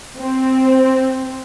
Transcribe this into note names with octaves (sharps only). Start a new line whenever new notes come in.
C4